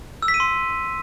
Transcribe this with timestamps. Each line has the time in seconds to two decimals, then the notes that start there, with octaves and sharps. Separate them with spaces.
0.22 E6
0.28 B6
0.34 D#7
0.40 C6